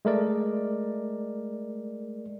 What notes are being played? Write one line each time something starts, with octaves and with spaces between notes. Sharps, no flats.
G#3 A3 A#4 D5